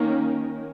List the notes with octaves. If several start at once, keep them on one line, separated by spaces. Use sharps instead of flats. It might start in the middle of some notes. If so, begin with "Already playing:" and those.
Already playing: D#3 A#3 C#4